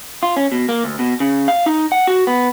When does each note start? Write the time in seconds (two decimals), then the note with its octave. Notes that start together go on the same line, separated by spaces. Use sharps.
0.23 F4
0.36 C#4
0.52 B2
0.69 A#3
0.84 D2
0.99 B2
1.20 C#3
1.48 F5
1.66 D#4
1.92 F#5
2.07 F#4
2.27 B3